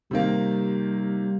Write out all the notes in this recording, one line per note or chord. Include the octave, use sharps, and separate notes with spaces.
C3 D#3 G3 A#3